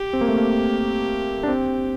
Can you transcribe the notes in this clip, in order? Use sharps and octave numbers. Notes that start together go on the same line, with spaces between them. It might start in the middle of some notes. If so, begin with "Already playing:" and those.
Already playing: G4
C4
A#3
A3
A#3
D4
C4